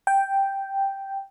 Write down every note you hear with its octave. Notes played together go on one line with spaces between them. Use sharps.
G5